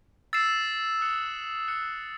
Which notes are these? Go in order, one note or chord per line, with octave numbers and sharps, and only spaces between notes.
E6 A6 C7 E7
D#6 F#6 C#7 F#7
F#6 C#7 E7